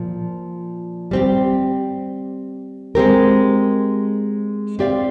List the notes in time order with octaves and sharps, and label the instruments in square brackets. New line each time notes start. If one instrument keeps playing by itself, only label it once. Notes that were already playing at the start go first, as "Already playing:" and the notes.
Already playing: [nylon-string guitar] A#2 F3 F4
G3 C4 G4
G#3 C4 G4 A#4
C4 G4 D5 F5